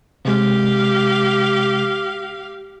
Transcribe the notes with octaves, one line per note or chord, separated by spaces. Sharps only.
C3 G#3 G4 F5